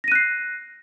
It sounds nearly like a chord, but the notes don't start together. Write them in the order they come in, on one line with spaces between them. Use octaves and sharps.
A#6 D#7 F#6 C7